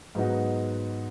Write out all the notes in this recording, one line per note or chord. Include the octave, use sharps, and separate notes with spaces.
G#2 F#3 B3 D#4 F#4